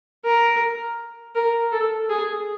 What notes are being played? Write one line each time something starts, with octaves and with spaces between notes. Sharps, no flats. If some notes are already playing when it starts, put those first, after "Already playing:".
A#4
A#4
A4
G#4